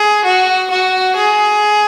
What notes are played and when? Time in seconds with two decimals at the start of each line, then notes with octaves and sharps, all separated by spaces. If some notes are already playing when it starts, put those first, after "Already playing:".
Already playing: G#4
0.24 F#4
0.70 F#4
1.16 G#4